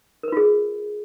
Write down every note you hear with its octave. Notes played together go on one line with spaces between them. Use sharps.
F4 G#4 A#4 B4